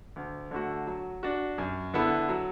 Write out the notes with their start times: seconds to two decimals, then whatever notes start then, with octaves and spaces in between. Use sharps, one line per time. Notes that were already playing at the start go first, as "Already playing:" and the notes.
0.16 D2
0.51 D3 A3 F#4
0.87 F#3
1.23 D4 F#4
1.58 F#2
1.93 D3 B3 E4 A4
2.29 F#3